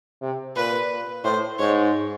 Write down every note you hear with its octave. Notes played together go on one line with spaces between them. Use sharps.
C3
A#2 B4
A2 C5
G#2 C#5